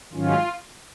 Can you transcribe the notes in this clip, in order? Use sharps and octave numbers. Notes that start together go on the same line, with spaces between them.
G#2 D#3 F#3 C#4 F4